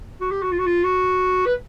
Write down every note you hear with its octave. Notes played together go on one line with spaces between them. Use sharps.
F#4
G4
F#4
F4
F#4
F4
F#4
B4